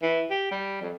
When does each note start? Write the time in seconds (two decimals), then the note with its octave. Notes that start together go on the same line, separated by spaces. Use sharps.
0.02 E3
0.30 G4
0.51 G3
0.81 F2